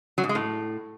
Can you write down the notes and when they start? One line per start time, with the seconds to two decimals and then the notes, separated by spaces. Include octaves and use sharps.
0.18 F#3
0.24 G#2
0.29 G#3
0.35 A2